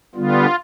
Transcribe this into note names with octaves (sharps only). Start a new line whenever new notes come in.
D3 G3 B3 F4